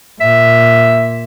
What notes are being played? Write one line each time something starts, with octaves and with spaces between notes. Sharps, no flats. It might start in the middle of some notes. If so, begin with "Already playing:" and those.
A#2 E5